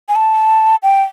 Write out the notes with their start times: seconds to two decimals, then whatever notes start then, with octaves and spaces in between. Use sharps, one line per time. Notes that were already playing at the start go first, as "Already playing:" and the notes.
0.09 G#5
0.16 A5
0.83 G5